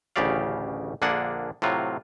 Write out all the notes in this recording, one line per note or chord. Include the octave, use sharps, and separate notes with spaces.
A1 D2 C#3 G4 D5 F5
A#1 D3 A#3 D4 G#4 F#5
A2 C3 F#3 F4